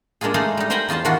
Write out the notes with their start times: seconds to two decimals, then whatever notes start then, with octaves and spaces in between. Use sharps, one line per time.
0.21 G#3 A#3 D4 F4 G#4
0.34 G#3 A3 D#4 D5 F5
0.57 G3 D#4
0.70 A#4 C5 G5 G#5 A#5 B5
0.88 E2 F4 D#5 A5 C6
1.05 D#3 E3 D4 F4 F#4